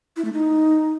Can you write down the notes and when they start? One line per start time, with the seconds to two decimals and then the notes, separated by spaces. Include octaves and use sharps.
0.17 E4
0.25 A3
0.33 D#4